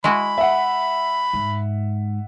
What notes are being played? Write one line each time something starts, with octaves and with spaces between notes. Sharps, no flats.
G#3 E4 F#4 B5
E5 F#5
G#2